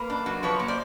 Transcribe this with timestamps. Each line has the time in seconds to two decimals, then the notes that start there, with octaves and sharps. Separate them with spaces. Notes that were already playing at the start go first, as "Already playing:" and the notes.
Already playing: A#3 B4
0.10 D4
0.26 F#3
0.43 F3 B4 C#5
0.59 A#3
0.68 C5 D5